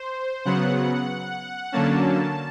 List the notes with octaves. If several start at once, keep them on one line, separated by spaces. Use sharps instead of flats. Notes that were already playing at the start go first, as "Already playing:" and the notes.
Already playing: C5
C#3 F#3 B3 F#5
D3 F#3 A#3 C#4 A5